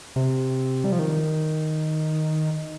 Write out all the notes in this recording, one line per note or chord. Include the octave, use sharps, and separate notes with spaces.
C3
G3
F3
D#3